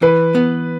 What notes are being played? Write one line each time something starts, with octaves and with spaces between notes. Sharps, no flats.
E3 B4
B3